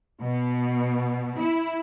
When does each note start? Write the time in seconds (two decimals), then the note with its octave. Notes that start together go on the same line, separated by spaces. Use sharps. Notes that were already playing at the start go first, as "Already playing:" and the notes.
0.21 B2
1.40 E4